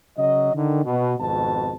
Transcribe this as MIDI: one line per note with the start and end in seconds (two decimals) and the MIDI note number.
0.17 0.52 49
0.17 0.52 54
0.17 0.52 75
0.54 0.82 50
0.54 0.82 51
0.84 1.14 47
1.19 1.75 32
1.19 1.75 41
1.19 1.75 47
1.19 1.75 81